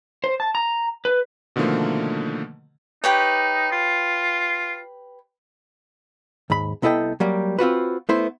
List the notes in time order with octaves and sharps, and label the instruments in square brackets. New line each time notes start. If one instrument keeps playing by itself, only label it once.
[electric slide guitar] C5
A5
A#5
B4
[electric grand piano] B2 D3 D#3 F3 A3 A#3
[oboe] D#4 [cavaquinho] G4 B4 C#5
[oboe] F4
[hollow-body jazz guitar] D#2 G#2 B5
C2 B3 E4 A4 D#5 G5
F#3 G3 A#3
C4 F4 F#4 B4
A3 B3 E4 C5